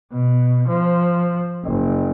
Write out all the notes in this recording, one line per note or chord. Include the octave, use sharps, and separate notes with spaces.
B2
F3
F#1